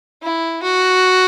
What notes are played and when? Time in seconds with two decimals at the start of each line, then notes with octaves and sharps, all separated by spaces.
0.23 E4
0.63 F#4